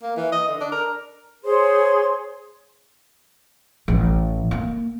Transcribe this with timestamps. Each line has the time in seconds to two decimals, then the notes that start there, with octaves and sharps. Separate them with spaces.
0.02 A#3
0.17 E3
0.32 D#5
0.48 D3
0.60 D4
0.72 A#4
1.44 G#4 C5 C#5 C6
3.88 A1
4.51 A#3